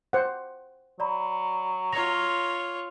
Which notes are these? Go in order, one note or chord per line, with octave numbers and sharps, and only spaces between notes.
C5 F#5
F#3 D5 A#5 B5
F4 C#5 A#5 A#6 F7